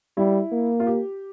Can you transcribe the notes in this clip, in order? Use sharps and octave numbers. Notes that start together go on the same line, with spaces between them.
G3 E4
A#3
F4
G4